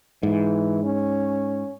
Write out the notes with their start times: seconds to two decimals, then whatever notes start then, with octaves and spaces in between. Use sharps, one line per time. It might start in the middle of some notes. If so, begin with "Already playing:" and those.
0.23 G#2 E3
0.84 C#4